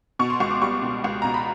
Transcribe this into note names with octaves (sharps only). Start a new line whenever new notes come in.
B2 C#6
C6
C#2 C#6
D6
G3 C#6
B2
C#2
B2 A#5
B5